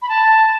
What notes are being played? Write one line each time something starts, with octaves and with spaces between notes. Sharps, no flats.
B5
A5